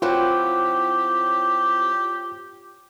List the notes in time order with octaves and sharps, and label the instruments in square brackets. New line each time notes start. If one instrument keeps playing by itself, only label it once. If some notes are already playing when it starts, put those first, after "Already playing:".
[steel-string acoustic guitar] F#3 C4 E4 [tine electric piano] F4 [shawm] G4